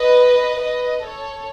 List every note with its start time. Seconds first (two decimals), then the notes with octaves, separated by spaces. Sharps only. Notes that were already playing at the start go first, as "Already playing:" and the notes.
Already playing: B4 D#5
0.60 B4 D#5
1.02 A4 C#5